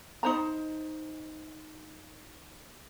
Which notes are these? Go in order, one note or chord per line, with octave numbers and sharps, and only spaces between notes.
D#4 C5 A#5